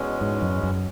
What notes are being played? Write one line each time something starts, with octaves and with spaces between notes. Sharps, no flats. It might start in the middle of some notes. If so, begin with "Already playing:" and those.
Already playing: E2 B2 G#3 C#4
G#2
F#2
F#2